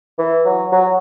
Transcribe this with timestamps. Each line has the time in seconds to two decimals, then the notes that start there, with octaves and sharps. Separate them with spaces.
0.18 E3
0.45 F#3
0.72 F#3